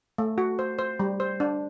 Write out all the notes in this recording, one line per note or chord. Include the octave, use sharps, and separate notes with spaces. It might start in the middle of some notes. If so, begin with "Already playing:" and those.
A3
F#4
C5
C5
G3
C5
D4